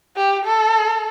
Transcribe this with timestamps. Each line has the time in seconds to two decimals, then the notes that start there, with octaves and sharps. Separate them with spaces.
0.16 G4
0.45 A4